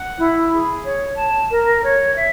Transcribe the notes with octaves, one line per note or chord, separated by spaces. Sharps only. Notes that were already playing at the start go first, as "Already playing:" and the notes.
Already playing: F#5
E4
G#4
C#5
A5
A#4
C#5
E5